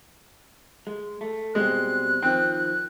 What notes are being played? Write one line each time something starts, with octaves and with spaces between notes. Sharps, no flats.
G#3
A3
B2 G3 G#3 C4 F#6
D#3 F3 C4